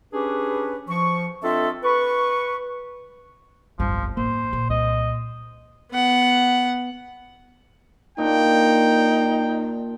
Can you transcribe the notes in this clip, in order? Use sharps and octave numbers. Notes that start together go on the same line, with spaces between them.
C#4 D4 G4 G#4 B4
F3 C#6
C4 D4 F4 A4 D#5 E5
B4 C#6
G1 C2 F2 F3 G3 B3
A1 A#3 C5
A#2
C2 D#5
B3 F#5
A#2 D4 D#4 G5